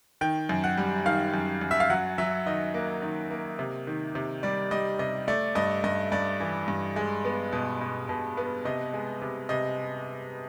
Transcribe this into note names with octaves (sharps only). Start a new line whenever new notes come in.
D#3 G5
F#2
F#5
G3
D#3 F5
F#2
F#2
E5
F5
F#3 F#5
F#3 E5
D#3 D#5
A#3
D#3
A#3
C3
D#3
C3
G3 D5
G3 D#5
C3 D#5
A3 D5
G2 D#5
G2 D#5
G2 D5
E3
G2
G#3
B3
B2
B2
B2
B3
C3 D#5
G#3
C3
C3 D#5